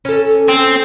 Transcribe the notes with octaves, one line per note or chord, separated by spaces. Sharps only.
C#4 A4
C4